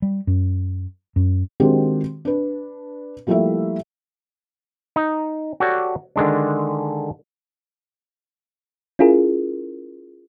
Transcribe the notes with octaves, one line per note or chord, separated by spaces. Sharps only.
G3
F#2
F#2
D#3 G#3 C4 D4 F#4 G4
D4 B4
F3 G3 A3 A#3 E4 E5
D#4
F#4 G4 A4 C#5 D5 G5
D3 D#3 G#3 D4
C#4 E4 F4 G#4 A#4